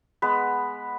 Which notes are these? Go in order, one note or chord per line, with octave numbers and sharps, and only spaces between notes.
G#3 B3 B4